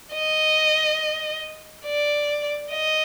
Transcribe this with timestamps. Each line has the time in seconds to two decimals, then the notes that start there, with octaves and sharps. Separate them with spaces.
0.13 D#5
1.86 D5
2.72 D#5